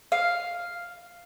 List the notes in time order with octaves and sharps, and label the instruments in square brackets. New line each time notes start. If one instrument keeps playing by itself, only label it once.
[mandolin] F5